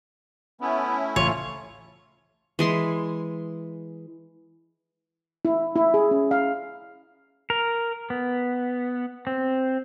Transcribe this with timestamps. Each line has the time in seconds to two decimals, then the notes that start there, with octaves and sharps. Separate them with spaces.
0.61 A3 B3 C#4 E4
1.16 A1 C#3 F4 C#5
2.59 E3 G#3 C6
5.45 E4
5.76 E4
5.94 G#4
6.11 C#4
6.31 F5
7.50 A#4
8.10 B3
9.27 C4